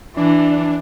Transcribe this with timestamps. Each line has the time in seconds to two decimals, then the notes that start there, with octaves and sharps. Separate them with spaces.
0.17 E3 D4